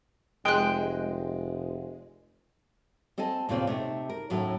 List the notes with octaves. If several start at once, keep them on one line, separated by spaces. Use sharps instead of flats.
F1 G#3 G5 F#6
C4 A4 D#5 G#5 A5
D#2 A#2 C#3 A#3 C4
C3 A3 D#4
A#4
D#2 A2 F#3 A3 C#4